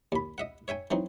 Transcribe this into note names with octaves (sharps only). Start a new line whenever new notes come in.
D#2 B5
D#5 E5 F#5
C#5 E5 G5 G#5
E3 F#3 C4 D#4